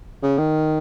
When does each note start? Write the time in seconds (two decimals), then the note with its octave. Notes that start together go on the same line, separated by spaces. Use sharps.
0.23 C#3
0.38 D#3